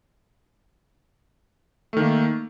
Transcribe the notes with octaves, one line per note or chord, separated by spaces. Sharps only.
D#3 A3 A#3